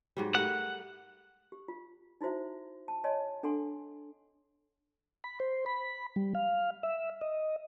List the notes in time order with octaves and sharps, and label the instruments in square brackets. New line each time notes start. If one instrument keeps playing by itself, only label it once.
[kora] G#2 F#3 G3
[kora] G3 A3 A#4 [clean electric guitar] F#5
[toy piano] G4
F4
D#4 E4 F#4 C5 E5
A5
C#5 D#5 G#5 A5 C6
D4 A4 F#5 G#5 C6
[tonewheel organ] B5
C5
B5
G3
F5
E5
D#5